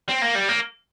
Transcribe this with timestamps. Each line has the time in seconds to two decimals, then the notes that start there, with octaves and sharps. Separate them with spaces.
0.09 C4
0.22 A#3
0.35 G3
0.49 A#3